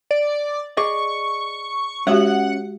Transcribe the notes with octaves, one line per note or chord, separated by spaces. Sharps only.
D5
G#4 D5 D#5 C#6 D6
G#3 C#4 F#4 G4 C#5 E5 F#5